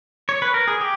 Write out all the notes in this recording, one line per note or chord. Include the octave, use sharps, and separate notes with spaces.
C#5
B4
A#4
G#4
G4